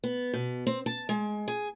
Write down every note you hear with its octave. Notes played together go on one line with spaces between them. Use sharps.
B3
B2
C4
A5
G#3
G#4